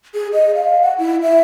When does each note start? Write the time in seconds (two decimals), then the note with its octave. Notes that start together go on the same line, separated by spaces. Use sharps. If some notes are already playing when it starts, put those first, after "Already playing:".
0.14 G#4
0.33 D#5
0.55 F5
0.81 F#5
0.98 E4
1.22 E5